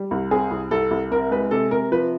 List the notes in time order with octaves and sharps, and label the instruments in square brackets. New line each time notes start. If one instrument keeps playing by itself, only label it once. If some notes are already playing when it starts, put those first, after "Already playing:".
Already playing: [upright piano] G3
C2
C4 G#4
C2
C2 A4
C2
C3 A#4
G#3 B4
C3 A4
C3 A#4
F3 B4